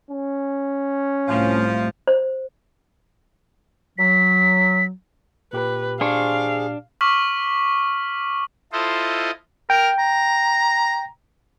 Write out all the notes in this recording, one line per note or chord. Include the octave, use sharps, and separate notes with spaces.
C#4
C2 A2 F3
C5
F#3 B6
A#2 G4 B4
D4 G#4 C5 F5 C#6
C#6 D6 F6 B6 F#7
E4 F4 A4 C5 D#5
A#4 G5
A#5